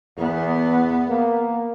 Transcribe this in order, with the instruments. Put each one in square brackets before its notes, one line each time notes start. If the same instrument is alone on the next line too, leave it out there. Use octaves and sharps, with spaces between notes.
[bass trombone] E2 [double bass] B3
[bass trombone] A#3